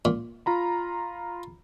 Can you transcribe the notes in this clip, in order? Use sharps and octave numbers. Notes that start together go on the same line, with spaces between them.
A#2
F4 A#5 B5